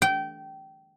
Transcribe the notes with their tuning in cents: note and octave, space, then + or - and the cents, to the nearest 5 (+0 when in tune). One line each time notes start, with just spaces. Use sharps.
G5 -20